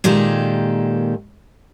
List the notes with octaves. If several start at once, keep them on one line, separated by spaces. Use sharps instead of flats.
A#2 D#3 G#3 G4 A4